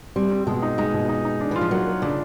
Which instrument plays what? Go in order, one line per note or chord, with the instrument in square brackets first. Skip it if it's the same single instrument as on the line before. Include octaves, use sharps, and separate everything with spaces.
[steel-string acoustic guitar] G3 [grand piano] C4
[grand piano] C4
[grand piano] B2 [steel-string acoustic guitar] G#3
[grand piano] D#4
[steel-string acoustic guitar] G#3 [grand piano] D#4
[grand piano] B2
D#4
D#4
D4
[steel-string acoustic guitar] E3 [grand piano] F4
[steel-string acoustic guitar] F3
[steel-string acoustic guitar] F#3 [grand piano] A#3
[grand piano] A#3
[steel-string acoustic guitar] C#3 [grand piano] D4